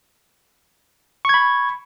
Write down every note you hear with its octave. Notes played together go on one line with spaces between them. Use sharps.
B5 C#6 G#6